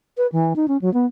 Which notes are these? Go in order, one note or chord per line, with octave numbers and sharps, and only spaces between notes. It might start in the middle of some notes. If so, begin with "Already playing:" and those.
B4
E3
D#4
C#4
F#3
B3